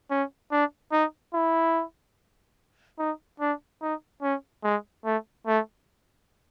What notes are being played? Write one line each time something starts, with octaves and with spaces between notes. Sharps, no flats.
C#4
D4
D#4
E4
D#4
D4
D#4
C#4
G#3
A3
A3